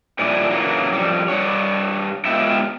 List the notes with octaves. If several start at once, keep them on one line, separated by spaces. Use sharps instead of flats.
A#2 G3 D4 E4 D5 G#5
C#3 E3 F#3 A#3
F2 G3
G2 G3 D4 C#5
G#3 B3 F4 G4 E5 G5